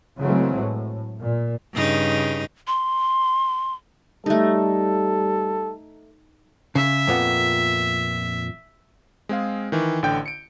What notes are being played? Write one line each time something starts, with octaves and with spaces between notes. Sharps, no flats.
C#3 E3 F#3 G#3 A3 C4
A2
A#2
G2 C#3 D#4
C6
G3 A3 D#4 A4
C#3 E5
F2 A#2 B3
G#3 C4 G#4 F5
D#3 E3
A1 D3 G5 G6
C#7 D7